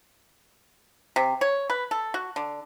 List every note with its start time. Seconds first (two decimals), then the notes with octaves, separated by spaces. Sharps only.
1.16 C3
1.41 C#5
1.70 B4
1.91 A4
2.14 F#4
2.36 D3